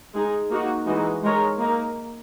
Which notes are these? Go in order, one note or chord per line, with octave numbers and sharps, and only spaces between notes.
G#3 D#4 G#4
A#3 D#4 F#4
E3 G#3 D#4 F#4
G#3 D#4 A#4 C#5
A#3 D#4 A#4